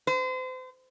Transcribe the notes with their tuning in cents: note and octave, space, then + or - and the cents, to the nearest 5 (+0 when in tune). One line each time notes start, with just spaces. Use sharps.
C5 -35